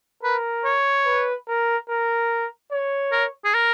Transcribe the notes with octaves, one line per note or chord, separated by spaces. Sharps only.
A#4 B4
C#5
B4
A#4
A#4
C#5
A#4
G#4
A#4